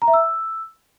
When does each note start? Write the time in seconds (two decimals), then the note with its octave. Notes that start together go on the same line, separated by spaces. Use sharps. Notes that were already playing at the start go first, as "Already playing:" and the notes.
0.02 A#5
0.08 E5
0.14 E6